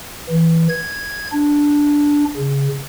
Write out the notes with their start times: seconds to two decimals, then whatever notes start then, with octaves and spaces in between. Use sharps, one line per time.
0.30 E3
0.69 G#6
1.33 D4
2.37 C#3